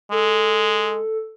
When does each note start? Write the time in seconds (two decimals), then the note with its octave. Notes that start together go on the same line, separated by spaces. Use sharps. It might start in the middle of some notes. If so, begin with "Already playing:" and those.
0.12 G#3 A4